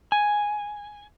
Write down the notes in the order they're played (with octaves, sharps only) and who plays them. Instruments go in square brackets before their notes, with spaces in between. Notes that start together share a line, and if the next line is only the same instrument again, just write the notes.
[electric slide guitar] G#5